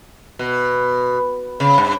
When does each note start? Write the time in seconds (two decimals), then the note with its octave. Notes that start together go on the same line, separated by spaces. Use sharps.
0.39 B2
1.60 C#3
1.78 G2